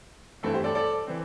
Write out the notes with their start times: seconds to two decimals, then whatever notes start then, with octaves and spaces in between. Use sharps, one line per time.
0.43 G2 E3 A3 C4 E4 A4
0.54 G4 C5
0.64 A4 D5
0.75 A4 D5
1.07 E3 C4